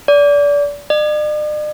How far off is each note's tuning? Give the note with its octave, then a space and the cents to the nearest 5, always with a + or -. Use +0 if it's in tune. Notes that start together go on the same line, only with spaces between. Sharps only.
D5 -30
D5 +45